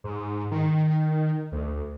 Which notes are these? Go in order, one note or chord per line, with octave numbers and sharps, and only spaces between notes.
G#2
D#3
D2